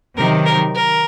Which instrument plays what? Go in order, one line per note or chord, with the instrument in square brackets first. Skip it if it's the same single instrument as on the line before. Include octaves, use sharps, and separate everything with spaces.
[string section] C3 D#3 F#3 [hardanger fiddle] A#4
[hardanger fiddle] A#4
A#4